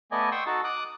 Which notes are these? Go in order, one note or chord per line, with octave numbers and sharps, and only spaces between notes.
A3 B3 D5 D#5 G#5
G5 C6 C#6 D#6 E6
D#4 F#4 A4 A5
D6 D#6 F#6